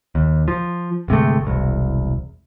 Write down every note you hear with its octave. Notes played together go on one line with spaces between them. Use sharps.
D#2
F3
G1 C3 G#3 A3
E1 C2